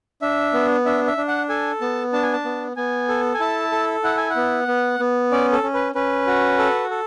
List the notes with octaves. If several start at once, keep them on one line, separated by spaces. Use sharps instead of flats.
D4 E5
B3
D4 E5
E5
D4
F#5
A4 G#5
B3 A5
D4 A5
G#5
A5
B3
B3 G#5
A4
G#5
E4 A5
A4
E4 F#5
G#5
F#5
B3
B3
B3
C#4 D5
A4
C#4
B4
C#4 B4
F#4
A4
A4